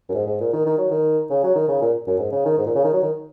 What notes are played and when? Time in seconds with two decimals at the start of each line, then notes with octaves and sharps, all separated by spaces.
0.09 F#2
0.14 G#2
0.27 G#2
0.40 A#2
0.53 D#3
0.66 D#3
0.78 F#3
0.91 D#3
1.30 C#3
1.43 F#3
1.55 D#3
1.68 C#3
1.82 A#2
2.07 F#2
2.19 G#2
2.32 C#3
2.45 D#3
2.58 G#2
2.66 A#2
2.75 C#3
2.84 D#3
2.93 F#3
3.03 D#3